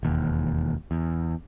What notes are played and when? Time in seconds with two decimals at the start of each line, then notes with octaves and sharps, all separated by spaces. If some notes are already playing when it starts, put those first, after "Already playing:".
0.03 E1 D#2
0.91 E2